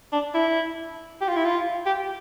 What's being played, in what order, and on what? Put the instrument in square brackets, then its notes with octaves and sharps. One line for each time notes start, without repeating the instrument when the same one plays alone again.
[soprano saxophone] D4
E4
G4
F4
E4
F4
G4